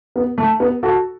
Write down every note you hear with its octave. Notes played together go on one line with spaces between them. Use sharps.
B3
A3
B3
F#4 A4